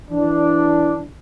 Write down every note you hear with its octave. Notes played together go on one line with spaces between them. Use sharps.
E3 D4